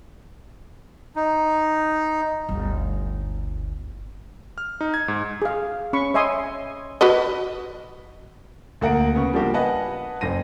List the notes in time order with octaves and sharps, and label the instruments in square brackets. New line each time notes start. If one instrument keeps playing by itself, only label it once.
[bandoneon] D#4
[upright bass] G1 D2
[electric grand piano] F6
D#4
G#6
G#2
[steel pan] G#4 F5
C#4 B5 C#6
C#5 D#5 E5 G#5 C6 D#6
[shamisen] F#4 B4 D#5
[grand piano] D2 A#3 F#5 A#5 D7
C#3 B3 C#6
F3 G3 A#3 D4 F#4 G4
B4 D#5 F#5 G#5 A5
F#1 C5 A#6 D#7